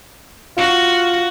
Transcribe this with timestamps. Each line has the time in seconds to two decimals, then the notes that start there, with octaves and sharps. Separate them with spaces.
0.57 F4 F#4